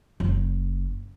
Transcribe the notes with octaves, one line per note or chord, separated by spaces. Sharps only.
F#1